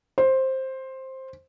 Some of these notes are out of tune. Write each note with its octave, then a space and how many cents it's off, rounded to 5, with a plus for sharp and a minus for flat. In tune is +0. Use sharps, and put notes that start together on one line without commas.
C5 +10